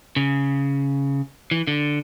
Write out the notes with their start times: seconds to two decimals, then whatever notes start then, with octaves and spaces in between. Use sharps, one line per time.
0.16 C#3
1.51 E3
1.67 D3